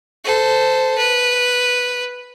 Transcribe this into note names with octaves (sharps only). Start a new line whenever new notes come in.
A4 C5
B4